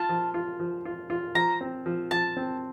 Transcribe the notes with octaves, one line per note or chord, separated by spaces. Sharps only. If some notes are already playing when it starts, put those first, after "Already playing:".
Already playing: F4 A5
F3
F4
F3
F4
F4
F3 A#5
C4
F3
F3 A5
C4